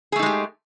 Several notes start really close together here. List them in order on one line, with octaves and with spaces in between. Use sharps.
G#4 A3 D#4 G#3 G4